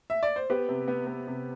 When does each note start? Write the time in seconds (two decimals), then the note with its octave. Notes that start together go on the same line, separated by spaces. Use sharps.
0.10 E5
0.23 D5
0.36 C5
0.50 B3 G4 B4
0.69 C3
0.88 B3
1.07 B3
1.27 C3